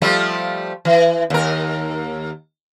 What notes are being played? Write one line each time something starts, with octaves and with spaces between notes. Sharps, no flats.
F3 G3 A3
E3
D#2 A#4